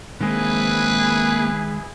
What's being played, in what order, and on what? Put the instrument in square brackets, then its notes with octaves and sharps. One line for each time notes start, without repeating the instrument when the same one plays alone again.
[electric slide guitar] D#3 G#3 [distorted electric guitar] A#3 C4 [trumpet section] E4 G#4 [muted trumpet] B4